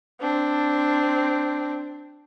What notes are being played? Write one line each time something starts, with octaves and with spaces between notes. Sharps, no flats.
C4 D4